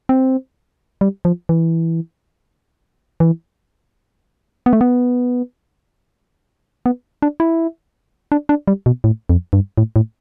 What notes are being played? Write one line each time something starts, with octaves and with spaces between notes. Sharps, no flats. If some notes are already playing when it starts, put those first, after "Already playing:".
C4
G3
F3
E3
E3
B3
A3
B3
B3
D4
E4
D4
D4
G3
B2
A2
F2
G2
A2
A2